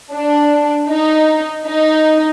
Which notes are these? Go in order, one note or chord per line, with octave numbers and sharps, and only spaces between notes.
D4
D#4
D#4